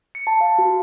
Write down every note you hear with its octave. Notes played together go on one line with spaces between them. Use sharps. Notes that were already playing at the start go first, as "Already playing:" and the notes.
C#7
A5
F5
F#4